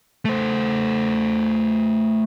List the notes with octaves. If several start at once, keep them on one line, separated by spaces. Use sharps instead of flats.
A3 C5